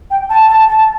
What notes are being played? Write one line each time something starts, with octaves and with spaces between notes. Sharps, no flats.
G5
A5
A5
A5